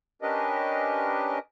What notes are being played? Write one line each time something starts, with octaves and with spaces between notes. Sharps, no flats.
C#4 D4 G4 A#4 B4 D#5